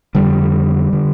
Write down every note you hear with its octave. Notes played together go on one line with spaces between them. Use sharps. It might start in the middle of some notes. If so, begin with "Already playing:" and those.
F2 D3 G3
D3